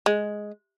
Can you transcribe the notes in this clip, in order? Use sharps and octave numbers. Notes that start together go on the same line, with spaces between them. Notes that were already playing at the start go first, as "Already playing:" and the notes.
G#3